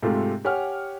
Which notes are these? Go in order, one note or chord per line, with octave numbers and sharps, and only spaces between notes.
G#2 C3 A3 F4 G4
G4 C#5 F#5 G#5 F6